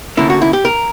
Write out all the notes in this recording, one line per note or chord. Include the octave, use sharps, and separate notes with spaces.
D2 D3 A#3 C#4 E4
F#4
E4
G4
A#4